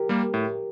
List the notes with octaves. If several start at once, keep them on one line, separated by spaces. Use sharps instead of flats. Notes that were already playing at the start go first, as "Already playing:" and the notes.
Already playing: G4 A#4
G3 A#3
A2